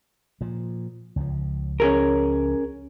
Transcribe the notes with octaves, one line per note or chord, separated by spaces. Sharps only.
A#2 F3
C#2 F3
C#4 G#4 A#4